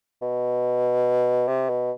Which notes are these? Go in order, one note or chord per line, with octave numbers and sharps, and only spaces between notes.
B2
C3
B2